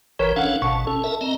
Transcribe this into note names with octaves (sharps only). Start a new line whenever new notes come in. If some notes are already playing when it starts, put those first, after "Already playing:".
G#1 E3 A#4 B4 C#5 G5
C#4 D4 A4 F5 F#5
G#1 B2 A5 C#6
C#4 A4
A#4 E5 A5
C4 D#5 A#5